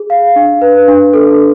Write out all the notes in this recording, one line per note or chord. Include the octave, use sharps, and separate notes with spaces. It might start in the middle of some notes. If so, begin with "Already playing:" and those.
Already playing: G#4
F5
D4
B4
D4
A4